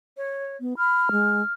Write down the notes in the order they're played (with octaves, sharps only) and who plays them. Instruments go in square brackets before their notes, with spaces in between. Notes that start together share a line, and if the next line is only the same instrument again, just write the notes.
[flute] C#5
[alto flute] B3
[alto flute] B5 [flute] F6
[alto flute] G#3